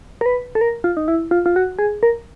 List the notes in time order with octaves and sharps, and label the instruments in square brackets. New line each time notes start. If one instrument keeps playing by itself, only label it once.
[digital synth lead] A#4
B4
A4
A#4
F4
D#4
E4
F4
F4
F#4
G#4
A#4